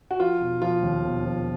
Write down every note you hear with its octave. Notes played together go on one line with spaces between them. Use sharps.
F#4
F3 F4
E1
F3 F4
D#2
E1
F3